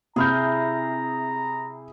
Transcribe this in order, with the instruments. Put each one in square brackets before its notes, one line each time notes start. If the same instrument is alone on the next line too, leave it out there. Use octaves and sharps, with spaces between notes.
[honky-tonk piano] C3 F6 G6 [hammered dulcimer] E4 G#4 [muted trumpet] A#5